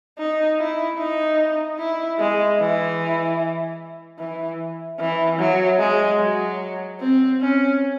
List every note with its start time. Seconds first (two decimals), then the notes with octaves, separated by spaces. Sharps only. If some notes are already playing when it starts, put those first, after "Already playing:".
0.18 D#4
0.58 E4
0.98 D#4
1.79 E4
2.19 G#3
2.60 E3
4.19 E3
5.00 E3
5.39 F#3
5.80 G#3
6.20 F#3
7.00 C4
7.40 C#4